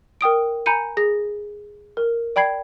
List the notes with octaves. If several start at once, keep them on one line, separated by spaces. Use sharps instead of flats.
A#4 G5 D#6 D7
G#5 A#5 B5 G6 C#7 D#7
G#4 A#6
A#4
D5 G5 B5 G#6 C7